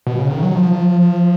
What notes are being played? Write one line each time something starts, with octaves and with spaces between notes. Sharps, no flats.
B2
C#3
D#3
F#3
F3